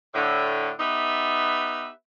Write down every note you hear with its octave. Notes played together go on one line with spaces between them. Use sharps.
A2 D3
B3 D#4 G4 B4 E5